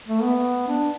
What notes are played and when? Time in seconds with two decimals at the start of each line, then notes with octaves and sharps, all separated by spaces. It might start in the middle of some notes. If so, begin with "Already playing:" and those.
0.08 A3
0.23 B3
0.68 D4